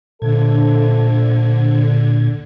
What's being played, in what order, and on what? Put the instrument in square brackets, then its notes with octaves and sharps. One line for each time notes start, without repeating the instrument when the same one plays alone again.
[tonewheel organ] A#2 G#6 [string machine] D3 [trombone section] F3 A3 A4